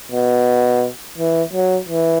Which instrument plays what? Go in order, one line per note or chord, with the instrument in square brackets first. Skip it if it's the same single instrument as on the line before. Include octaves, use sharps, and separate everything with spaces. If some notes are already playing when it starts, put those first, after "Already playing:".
[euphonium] B2
E3
F#3
E3